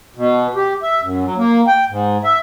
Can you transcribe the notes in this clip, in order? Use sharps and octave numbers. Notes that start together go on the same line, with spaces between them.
B2
G4
E5
F#2
F#3
A#3
G5
G#2
E5